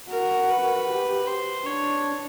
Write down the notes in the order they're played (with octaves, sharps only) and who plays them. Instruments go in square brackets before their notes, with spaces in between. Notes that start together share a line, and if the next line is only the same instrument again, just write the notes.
[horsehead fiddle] F#4 [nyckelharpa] A#4
[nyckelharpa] B4
[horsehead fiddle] G4
[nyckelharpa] C5
[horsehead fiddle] D4 [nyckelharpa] C#5